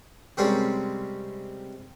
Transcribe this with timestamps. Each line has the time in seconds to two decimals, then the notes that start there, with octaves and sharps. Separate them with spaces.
0.37 C3 G3 G#3 C4 C#4 A#4